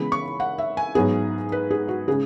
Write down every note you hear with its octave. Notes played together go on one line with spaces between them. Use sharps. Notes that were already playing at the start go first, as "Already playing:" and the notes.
Already playing: C#3 E3 G#3 B3 B5
C#6
F#5
E5
G#5
G#2 F#3 B3 G#4
B4
G#4
F#4
C#3 G#3 G#4